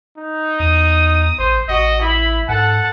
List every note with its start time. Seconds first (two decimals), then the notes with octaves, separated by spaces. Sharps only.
0.17 D#4
0.60 E2 D#6
1.39 A1 C5
1.69 A1 F#4 D#5
2.02 E4 B5
2.48 G#2 A4 F#5 A5